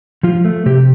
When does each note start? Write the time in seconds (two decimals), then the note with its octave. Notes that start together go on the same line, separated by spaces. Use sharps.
0.23 F3 F4
0.45 A3
0.66 C3 G4